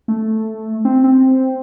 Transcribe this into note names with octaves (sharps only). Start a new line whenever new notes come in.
A3
C4
C4